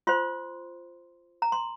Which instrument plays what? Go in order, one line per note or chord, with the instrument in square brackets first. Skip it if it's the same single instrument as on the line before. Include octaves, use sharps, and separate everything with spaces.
[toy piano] F4 C5 C6
A#5
C6